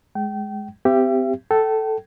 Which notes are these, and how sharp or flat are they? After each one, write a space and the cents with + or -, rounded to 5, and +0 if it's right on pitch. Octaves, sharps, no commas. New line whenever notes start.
G#3 +10 G5 -30
C4 -30 G4 +0 E5 +40
A4 +0 G5 -35